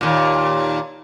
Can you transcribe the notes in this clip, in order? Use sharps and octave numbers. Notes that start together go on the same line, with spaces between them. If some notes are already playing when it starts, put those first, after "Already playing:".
D#2 A#2